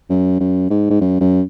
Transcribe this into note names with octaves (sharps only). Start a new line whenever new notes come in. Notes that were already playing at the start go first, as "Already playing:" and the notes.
F#2
F#2
G#2
G#2
F#2
F#2